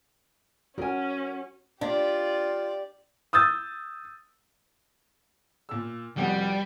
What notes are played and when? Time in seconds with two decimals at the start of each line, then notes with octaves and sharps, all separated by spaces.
0.78 C#4 F#4 A#4 G#5
1.81 D4 F4 G4 D5
3.33 D#6 E6 G6 A6
5.69 A#2 E6
6.17 F1 F2 G3 F#4